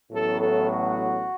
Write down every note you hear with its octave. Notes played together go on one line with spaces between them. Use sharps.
A1 A2 F#3 B3 A4
A4
F#4